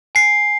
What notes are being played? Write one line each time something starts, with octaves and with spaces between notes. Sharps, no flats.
G#5 C7